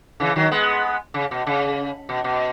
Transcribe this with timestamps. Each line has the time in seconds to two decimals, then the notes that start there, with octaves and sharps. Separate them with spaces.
0.20 C#3 E3
0.36 D#3 F#3
0.51 G#3 B3
1.14 C#3
1.31 B2
1.47 C#3
2.09 B2
2.24 B2